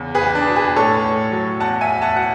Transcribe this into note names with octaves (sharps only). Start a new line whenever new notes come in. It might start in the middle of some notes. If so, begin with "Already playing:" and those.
Already playing: E2 C#3
G#4 B4
E2
D4
B2
G#4 B4
A2 A4 C#5
A2
F#3
E2 F#5 A5
E5 G#5
E2
F#5 A5
B2 F#5